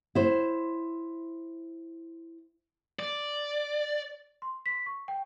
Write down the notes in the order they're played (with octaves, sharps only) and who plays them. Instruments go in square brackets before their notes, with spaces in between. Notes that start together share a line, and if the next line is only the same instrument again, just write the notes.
[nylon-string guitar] E4 C5
[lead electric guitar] D5
[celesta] C6
B6
C#6
G5